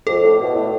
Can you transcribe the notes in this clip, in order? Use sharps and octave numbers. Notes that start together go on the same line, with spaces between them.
F2 A4
A2
B2
A2